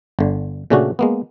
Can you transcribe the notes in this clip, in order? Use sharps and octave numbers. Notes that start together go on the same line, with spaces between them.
G1 D3
A#2 C#3 A3 C#4 D4 F#4
G#3 A#3 B3